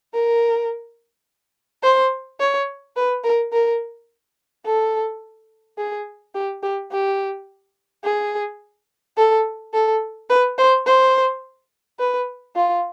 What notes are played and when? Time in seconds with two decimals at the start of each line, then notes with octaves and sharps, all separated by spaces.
0.14 A#4
1.83 C5
2.40 C#5
2.96 B4
3.24 A#4
3.53 A#4
4.65 A4
5.78 G#4
6.35 G4
6.63 G4
6.92 G4
8.04 G#4
9.17 A4
9.74 A4
10.30 B4
10.58 C5
10.86 C5
11.99 B4
12.56 F4